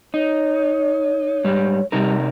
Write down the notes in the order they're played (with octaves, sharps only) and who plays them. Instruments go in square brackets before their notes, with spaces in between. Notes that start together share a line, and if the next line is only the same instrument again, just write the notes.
[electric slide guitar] D#4 [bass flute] C#5
[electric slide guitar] G#2 G3
[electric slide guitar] C3 D#4 A#4 [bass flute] G3